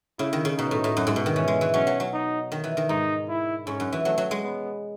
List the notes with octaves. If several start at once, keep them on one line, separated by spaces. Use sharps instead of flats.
C#3 E4
D#3
C#3
B2 D#4
A2
A2
F#2
G#2
B2
D#3
E3 C#4
G#3
E3
F#3 C#4
F#3
F#3
D#4
D#3
E3
D#3
G#2 D#4
E4
G#2 C#4
F#2
E3
F#3 A3
F#3
G#3
B3